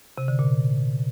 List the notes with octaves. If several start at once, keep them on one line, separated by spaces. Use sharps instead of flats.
C3
D3
A#2